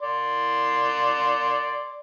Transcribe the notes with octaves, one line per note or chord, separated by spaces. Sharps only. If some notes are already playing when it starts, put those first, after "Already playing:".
D5 C6